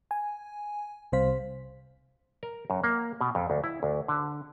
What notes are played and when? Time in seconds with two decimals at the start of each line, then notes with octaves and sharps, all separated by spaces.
0.11 G#5
1.12 C2 C3 G3 C5 F5 B6
2.43 A#4
2.70 F#2
2.84 A#3
3.21 B2
3.35 F2
3.50 D2
3.64 E4
3.83 D2
4.08 D3